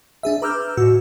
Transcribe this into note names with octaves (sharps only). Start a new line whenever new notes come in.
D4 G#4 E5
B4 A#5 D6 E6 F6 G6
A2 F#4 E6